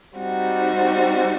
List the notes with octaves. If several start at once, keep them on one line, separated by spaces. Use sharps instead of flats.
G3 C4 D#4 F#4